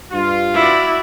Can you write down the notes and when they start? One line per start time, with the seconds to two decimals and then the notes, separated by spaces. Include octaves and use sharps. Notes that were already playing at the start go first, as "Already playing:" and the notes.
0.12 G2 F4
0.55 E4 F#4 D5